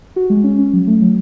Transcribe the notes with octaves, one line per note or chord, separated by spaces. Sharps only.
F#4
G#3
C#4
C#4
F#3
A3
F#3